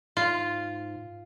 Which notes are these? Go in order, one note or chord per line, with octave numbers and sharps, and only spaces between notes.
G#2 F4